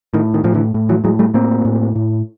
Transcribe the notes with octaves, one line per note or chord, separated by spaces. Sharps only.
A2 D#3
D#3
A2 F3
D3 E3
A2
E3 F#3
A2 F#3 G#3
G3 A3
A2 A#3 C4
A2
A2